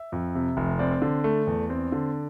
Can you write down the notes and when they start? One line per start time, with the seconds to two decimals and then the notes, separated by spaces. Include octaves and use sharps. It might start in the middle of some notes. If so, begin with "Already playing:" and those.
Already playing: E5
0.12 F2
0.35 C3
0.57 F1
0.79 C4 D5
1.02 D3
1.24 A3
1.47 E2
1.70 C4
1.92 D3